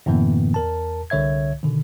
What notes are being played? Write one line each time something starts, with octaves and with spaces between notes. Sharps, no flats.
F#2 A2 D3 E3 A#3 B3
E2 A#4 A5
C2 D3 C#5 E5 G#6
B2 D3 D#3